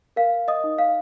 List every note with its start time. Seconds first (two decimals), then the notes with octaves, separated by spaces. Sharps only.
0.16 A#4 F5
0.48 D#5 D#6
0.64 D#4
0.78 F5